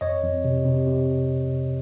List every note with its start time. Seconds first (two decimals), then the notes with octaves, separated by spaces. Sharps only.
0.01 F2 C#5 D#5
0.23 F2
0.44 C3
0.65 C3
0.87 C3